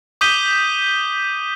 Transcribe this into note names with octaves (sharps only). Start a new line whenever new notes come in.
D6 D#6 G6 B6 D#7 G7